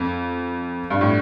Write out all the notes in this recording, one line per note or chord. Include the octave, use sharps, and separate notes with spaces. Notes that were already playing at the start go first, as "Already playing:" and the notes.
Already playing: F2
G2
A2